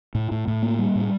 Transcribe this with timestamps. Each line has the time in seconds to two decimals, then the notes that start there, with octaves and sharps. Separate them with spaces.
0.15 A2
0.31 A2
0.48 A2
0.63 A#3
0.79 G3
0.95 A2